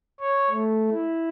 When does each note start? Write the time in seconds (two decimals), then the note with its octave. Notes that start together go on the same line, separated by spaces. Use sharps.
0.21 C#5
0.50 A3
0.90 E4